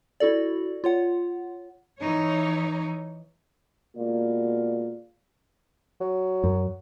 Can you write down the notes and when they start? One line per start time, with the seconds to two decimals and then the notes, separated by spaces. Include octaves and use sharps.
0.20 E4 F#4 A4 D5
0.84 F4 C#5 F#5
1.99 E3 D#4 C#5
3.97 B2 G#3 A#3 F4 D5
6.01 F#3
6.44 F#2